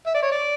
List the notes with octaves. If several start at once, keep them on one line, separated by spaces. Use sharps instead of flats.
E5
D5
C#5
D5